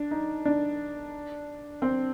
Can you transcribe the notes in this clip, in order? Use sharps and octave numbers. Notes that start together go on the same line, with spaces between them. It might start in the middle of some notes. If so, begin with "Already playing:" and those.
Already playing: D4
D#4
D4
C4